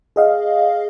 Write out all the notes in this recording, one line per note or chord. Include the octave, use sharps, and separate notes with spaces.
G#4 D#5 F5